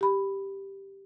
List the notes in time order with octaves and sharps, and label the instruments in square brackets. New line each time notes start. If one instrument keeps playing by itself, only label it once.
[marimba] G4 B5